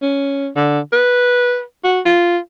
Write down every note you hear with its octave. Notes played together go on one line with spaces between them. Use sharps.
C#4
D3
B4
F#4
F4